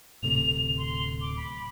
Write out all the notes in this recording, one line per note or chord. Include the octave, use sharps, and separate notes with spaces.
D1 C3 A3 F7
C6
D6
B5